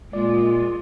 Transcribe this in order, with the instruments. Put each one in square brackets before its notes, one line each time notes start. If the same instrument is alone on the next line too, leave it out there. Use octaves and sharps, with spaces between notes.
[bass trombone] A#2 [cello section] G#3 [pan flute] F4 [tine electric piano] D5